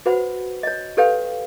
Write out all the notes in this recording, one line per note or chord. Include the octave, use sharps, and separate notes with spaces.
F#4 B4 C5 F#5 B5
C#5 D#5
G4 A4 B4 C#5 F5 G5